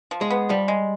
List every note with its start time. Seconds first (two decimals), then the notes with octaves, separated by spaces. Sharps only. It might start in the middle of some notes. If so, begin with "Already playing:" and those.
0.11 F3
0.21 G#3
0.30 B3
0.49 F3 G3
0.68 G#3